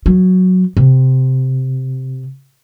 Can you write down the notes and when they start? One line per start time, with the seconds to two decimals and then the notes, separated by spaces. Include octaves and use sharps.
0.06 F#3
0.77 C3